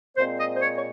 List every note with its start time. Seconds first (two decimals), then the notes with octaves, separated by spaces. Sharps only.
0.16 A#2 G#3 C4 C5
0.38 D#5
0.56 C5
0.60 C#5
0.77 C#5